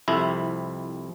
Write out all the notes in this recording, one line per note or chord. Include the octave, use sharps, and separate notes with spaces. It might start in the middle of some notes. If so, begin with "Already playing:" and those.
C2 F2 C3 E4